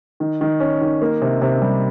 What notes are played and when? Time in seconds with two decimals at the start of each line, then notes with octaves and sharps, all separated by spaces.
0.20 D#3
0.41 D#3
0.60 C#4
0.81 D#3
1.02 A#3
1.22 C3
1.41 C3
1.62 G3